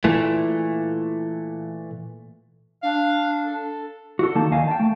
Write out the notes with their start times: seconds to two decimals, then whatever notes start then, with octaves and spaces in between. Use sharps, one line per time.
0.04 A#2 E3 A3
2.83 D4 F5
3.45 A4
4.19 F#4 A4
4.35 D#3 A#3 D#4 A5
4.51 D2 D#3 D#5 F5 G#5
4.68 G5 A5
4.80 A3